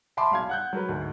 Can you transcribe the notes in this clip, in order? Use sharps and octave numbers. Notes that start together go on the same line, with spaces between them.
E5 G#5 A5 B5 C6 D6
B1 F5 G#6
F#5 F#6 G6
F#3 A#4 B4
D2 G#2